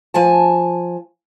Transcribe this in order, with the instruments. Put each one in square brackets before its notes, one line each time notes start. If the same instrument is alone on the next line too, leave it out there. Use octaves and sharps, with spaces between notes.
[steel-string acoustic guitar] F3 G#5 A5